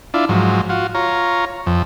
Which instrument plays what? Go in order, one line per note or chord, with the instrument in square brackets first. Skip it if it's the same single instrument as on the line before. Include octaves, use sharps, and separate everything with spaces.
[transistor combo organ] D4 E4 F4
G#2 F3 F#3
F4 F#4
F4 C#5 A#5
F2